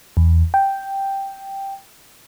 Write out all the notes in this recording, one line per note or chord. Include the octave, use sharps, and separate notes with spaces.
E2
G5